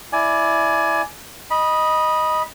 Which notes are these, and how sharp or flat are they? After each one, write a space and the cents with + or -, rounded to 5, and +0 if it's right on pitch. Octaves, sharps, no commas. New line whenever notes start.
E4 +0 D5 +0 G#5 +25
D#5 +0 B5 -20